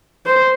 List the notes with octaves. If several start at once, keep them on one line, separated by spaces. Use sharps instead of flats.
C5